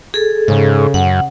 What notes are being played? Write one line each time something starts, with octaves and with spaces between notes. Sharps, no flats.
G#4 A4
G#2 C#3
F#2 F#5